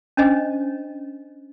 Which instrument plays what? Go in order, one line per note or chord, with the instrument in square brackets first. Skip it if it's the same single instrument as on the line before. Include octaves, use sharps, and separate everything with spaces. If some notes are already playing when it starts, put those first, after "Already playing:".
[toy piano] C#4 D4 C5 D#5